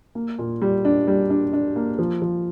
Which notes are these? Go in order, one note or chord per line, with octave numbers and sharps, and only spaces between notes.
A#3
A#2
G3
D4
G3
D4
D4
A#3
F3
F3